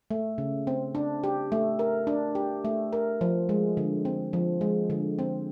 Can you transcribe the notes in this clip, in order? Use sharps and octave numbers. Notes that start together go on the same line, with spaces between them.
A3
C#3
C4
D4
G4
A3
A#4
D4
G4
A3
A#4
F3
G#3
D3
C4
F3
G#3
D3
C4